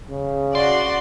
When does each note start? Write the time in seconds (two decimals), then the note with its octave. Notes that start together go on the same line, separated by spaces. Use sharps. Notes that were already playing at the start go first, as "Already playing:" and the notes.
0.10 C#3
0.55 F#4 D5 C6